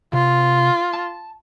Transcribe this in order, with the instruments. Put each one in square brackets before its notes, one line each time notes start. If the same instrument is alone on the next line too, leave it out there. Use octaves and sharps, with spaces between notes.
[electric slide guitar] C3 [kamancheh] F4
[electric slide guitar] A5